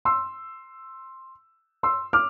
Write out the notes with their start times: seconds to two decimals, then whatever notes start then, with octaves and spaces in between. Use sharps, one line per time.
0.05 C6 E6
1.83 C6 E6
2.13 D6 F6